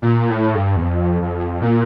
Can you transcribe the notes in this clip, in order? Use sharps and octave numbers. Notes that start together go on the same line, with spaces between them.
A#2
A2
G2
E2
F2
F2
A#2